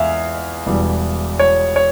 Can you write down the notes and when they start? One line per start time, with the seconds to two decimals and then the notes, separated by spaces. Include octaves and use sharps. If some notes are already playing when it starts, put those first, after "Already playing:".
Already playing: E2 G#3 E5 F5 G#5
0.66 E1 E2 E3 G3
1.39 C#5
1.76 C#5